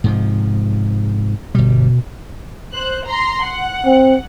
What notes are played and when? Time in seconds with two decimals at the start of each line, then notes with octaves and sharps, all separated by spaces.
0.04 G#2 C3 F3
1.55 G1 B2 G3
2.72 C5 F#6
3.05 A#5 C6
3.42 F#5
3.85 C4